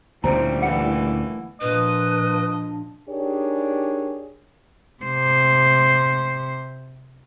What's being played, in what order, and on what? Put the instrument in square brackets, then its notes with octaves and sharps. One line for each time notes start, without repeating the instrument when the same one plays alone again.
[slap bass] D2 A#2 C#3 [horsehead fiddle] G3 E4 [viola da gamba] C4 [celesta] C5 A#5
[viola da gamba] E3 A3 A#3 [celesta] F#5 C#7
[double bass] A#2 F3 [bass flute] D4 [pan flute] B4 [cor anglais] D#5
[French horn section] D4 D#4 G4 G#4 A#4 C#5
[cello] C3 C5